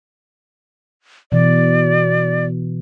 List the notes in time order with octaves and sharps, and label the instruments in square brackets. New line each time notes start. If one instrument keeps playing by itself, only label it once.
[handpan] B2 E3 [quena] D5